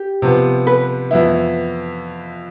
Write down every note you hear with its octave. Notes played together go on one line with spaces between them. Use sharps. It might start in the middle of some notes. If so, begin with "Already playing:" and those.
Already playing: G4
C3 F3 B3
B4
F2 E3 B3 E4